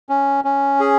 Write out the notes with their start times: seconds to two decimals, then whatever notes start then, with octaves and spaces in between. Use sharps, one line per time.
0.09 C#4
0.45 C#4
0.80 G#4